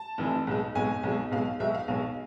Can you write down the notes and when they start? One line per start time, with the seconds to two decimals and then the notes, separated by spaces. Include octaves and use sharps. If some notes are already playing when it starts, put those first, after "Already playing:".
Already playing: A5
0.18 F1 F2 E3
0.47 B1 B2 G#3
0.75 B1 B2 G#3 G#5
1.03 B1 B2 G#3
1.31 B1 B2 G#3 F5
1.60 B1 B2 G#3 E5
1.74 F5
1.88 B1 B2 G#3 F5